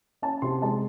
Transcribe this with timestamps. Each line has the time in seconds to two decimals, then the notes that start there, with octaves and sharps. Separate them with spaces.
0.22 C#4 A5
0.42 C3 C6
0.62 G#3 A5